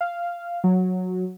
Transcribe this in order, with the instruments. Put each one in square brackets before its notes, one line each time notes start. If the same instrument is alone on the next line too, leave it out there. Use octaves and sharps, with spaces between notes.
[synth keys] F5
F#3